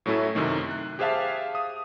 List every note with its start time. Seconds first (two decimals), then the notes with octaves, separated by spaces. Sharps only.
0.06 A2 F#3 A3 C#4 E4 A4
0.35 F#2 C3 D#3 A3
0.71 F#6
0.99 G4 G#4 C5 E5 F5 A5
1.55 D#6